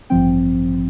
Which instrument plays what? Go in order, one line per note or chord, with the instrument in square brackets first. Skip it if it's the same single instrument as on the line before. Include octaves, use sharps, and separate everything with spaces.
[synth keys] A1 G2 F3 C4 G5